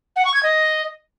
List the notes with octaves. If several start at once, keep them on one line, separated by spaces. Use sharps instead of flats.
F#5
C#6
G#6
D#5